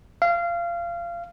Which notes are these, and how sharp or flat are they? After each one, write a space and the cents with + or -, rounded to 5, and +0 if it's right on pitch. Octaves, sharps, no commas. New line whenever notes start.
F5 -25